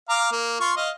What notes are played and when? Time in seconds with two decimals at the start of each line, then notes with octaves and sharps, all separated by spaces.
0.09 F5 A#5 D6
0.32 A#3
0.60 F4 C6 C#6
0.77 D#5 F5